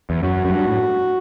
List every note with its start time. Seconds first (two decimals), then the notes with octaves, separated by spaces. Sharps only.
0.10 E2
0.22 F#2 F#4
0.45 F#2
0.50 G2
0.68 A2